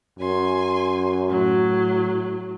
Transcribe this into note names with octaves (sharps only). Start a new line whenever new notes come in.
F#2 G#5 C6
A2 F#3